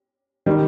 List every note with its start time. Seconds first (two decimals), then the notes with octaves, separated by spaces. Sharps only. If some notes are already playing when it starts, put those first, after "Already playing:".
0.46 D#3 G3